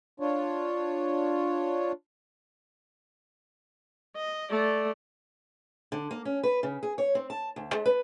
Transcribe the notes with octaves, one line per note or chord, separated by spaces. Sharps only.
D4 F4 C#5
D#5
A3 D5
D3
A#3
C#4
B4
C#3
G#4
C#5
C4
A5
D2
G#3
B4